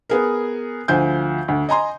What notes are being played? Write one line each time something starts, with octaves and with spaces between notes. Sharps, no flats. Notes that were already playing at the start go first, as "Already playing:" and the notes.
B3 G#4 A#4
D2 F3 C5 G#5 G6
D2
D#5 G#5 A#5 C6